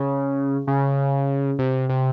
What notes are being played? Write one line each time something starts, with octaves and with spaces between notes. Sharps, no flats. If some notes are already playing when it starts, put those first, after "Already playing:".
Already playing: C#3
C#3
C3
C3